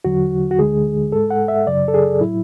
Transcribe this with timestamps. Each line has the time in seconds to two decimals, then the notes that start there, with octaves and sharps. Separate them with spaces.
0.05 E2 D3 F#3 F#4
0.51 F#4
0.58 D2 D3 G#3 G#4
1.12 G#2 G#3 A4
1.31 F#5
1.48 E5
1.67 F#2 C#3 F#3 D5
1.88 A4
1.94 G#4
2.20 A2 F#3 E4